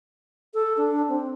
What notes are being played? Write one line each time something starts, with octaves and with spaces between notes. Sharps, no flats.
A4
D4
C4